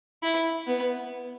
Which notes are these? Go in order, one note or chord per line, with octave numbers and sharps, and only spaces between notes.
E4
B3